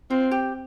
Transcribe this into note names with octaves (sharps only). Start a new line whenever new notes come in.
C4 F4
G4